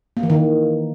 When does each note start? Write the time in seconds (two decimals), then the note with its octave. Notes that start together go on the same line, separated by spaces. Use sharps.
0.17 A#3
0.23 E3
0.30 D#3